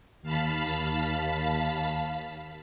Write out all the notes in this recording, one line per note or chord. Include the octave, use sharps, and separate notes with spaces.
D#2 F5 A5 B5 B6